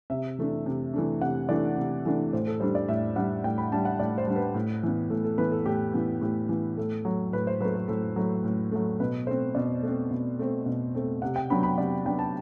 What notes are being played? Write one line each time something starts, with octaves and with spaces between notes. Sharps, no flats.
C3 E5
E3 A3 D4
C3
E3 A3 D4
C3 F#5
E3 A3 D4 D5
C3
E3 A3 D4
A2 C5
A4
G3 D4 C5
D5
A2 E5
G3 D4 F#5
A2 G5
B5
G3 D4 A5
F#5
A2 D5
C5
G3 D4
B4
A2
E3 B3
A2 A4
A4
E3 B3 B4
A4
A2 G4
E3 B3
A2 G4
E3 B3
A2 A4
F#3 A3
A2 B4
C5
F#3 A3 B4
A4
A2 A4
F#3 A3
A2
F#3 A3
B2 B4
A3 C4 C5
B2 D5
A3
C4
B2
A3 C4
B2
A3 C4
C3 F#5
G5
F#3 B3 D4 B5
B5
C3 D5
F#3 B3 D4 G5
A5